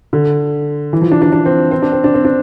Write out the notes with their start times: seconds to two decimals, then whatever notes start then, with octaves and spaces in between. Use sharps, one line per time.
0.13 D3
0.93 E3
1.02 F3
1.12 D4
1.22 D4
1.32 D4
1.45 C4
1.71 C4
1.82 D4
1.92 C4
2.04 D4
2.14 C4
2.25 D4